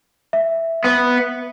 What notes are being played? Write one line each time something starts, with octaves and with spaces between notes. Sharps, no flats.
E5
B3